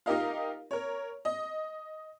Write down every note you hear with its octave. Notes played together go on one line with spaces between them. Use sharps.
D#4 F4 G4 A#4 D#5 F5
A#4 C#5
D#5